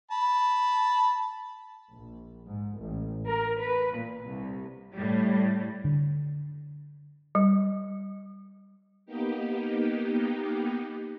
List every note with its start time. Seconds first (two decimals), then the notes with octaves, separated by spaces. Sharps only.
0.11 A5 B5
1.92 A#1
2.46 G#2
2.81 A1
3.26 A#4
3.59 B4
3.95 A#2
4.24 C2
4.94 A2 G3
5.84 D3
7.35 G3
9.06 A#3 B3 D#4 G4